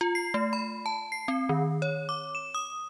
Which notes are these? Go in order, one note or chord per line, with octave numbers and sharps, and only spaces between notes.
F4
C7
A3
B5
A5
C7
C4
D#3
C#5
D6
E7
D#6